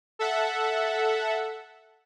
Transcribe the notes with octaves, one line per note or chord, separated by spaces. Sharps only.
A4 E5 F#5